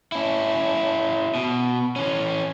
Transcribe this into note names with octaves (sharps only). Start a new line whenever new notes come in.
C#4 E4
B2
E3 C#4